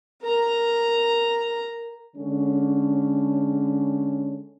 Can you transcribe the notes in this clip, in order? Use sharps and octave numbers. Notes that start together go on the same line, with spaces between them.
A#4 A#5
D3 G#3 C#4